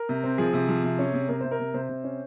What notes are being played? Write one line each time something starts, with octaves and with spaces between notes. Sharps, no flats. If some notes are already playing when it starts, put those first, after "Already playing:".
Already playing: A#4
C3
C4
F3 G#4
C3
F3
C3
C#4
C3
C3 A#4
C3 C5
A#4
C3
C3 C5
C3
C#4